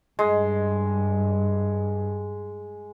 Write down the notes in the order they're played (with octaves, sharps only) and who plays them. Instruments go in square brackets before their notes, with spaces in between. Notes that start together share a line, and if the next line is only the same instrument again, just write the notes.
[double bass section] G2 [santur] G#3